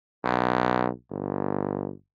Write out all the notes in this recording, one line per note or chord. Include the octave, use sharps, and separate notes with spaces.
B1
G1